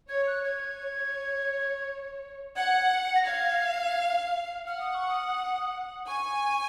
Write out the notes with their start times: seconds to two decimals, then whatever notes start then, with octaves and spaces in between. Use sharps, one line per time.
0.09 C#5 G#6
0.27 F#6
0.45 C#5 G#6
2.56 F#5 G#6
3.16 A#6
3.26 F5 G#6
4.67 F#5 F6
4.81 D#6
4.95 C#6
5.08 D#6
6.07 G#5 C#6